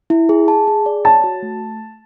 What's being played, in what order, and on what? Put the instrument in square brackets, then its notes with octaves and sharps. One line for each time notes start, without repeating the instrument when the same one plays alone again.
[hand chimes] E4
G#4
A5
G#4
D5
[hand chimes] C#5 [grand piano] A5
[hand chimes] F#4
A3